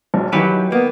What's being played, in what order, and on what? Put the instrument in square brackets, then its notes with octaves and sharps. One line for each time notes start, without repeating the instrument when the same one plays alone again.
[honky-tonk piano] A#1 F#3
[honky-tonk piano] D#3 E3 [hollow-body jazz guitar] F#3 G4 B4
[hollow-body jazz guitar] A#3 [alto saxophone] B3